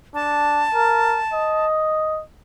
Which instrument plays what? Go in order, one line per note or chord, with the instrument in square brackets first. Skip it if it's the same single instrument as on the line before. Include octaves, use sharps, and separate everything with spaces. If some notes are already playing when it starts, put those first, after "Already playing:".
[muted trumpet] D4 [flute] A5
[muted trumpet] A#4
D#5